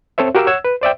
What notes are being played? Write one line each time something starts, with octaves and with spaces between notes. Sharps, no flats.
C4 A4 C5 C#5 E5
F#4 G4 A#4 F5 D6 E6
C#5 F#5 E6 G#6
B4
C5 D5 E5 G5